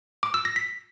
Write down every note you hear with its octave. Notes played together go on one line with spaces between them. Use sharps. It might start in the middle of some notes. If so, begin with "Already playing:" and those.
D6
E6
A#6
B6